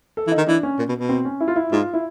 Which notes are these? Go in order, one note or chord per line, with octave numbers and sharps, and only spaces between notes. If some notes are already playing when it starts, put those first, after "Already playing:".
A4
E3
D#4
D#3
E3 D4
C#4
A#2
B2
B2
C4
C#4
E4
F4
E4
G#2 F4
E4